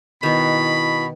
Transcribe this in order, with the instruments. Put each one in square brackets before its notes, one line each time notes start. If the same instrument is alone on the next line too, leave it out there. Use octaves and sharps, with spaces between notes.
[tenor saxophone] B2 [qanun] D#3 B3 [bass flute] E4 [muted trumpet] B5